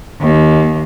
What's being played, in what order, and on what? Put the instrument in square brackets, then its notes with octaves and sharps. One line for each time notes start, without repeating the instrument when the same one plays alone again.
[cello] D#2